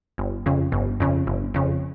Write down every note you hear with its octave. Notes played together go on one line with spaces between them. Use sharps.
G1
F2 C#3
G1
F2 C#3
G1
F2 C#3